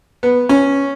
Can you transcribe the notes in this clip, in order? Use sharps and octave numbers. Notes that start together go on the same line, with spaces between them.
B3
C#4